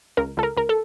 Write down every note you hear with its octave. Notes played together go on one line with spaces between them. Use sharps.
C#2 A#4
C#2 A4
A#4
C#2 A#4
A4